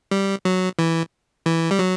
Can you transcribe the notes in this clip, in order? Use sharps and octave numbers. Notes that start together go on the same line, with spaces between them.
G3
F#3
E3
E3
G3
F#3